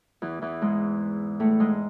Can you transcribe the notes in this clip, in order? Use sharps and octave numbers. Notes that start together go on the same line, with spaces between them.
E2 E3
E2 E3
G#2 G#3
A2 A3
G#2 G#3